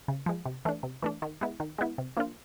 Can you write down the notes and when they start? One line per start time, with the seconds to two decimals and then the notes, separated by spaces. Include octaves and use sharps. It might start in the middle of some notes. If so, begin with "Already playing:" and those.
0.08 C#3
0.26 F3 G#3
0.46 C3
0.65 E3 A3 D4
0.83 C3
1.02 E3 A3 D4
1.22 D#3
1.41 G#3 B3 E4
1.60 D#3
1.78 G#3 B3 E4
1.98 C3
2.17 F3 A#3 D4 F4